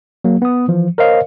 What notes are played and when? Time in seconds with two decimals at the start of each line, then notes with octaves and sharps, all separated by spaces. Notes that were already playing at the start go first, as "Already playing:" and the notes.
0.24 F#3 A#3
0.42 B3 D#6
0.68 E3 F3
0.98 A#4 C5 C#5 D#5 F5